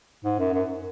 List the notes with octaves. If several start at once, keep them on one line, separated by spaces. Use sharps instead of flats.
G#2
F#2
F#2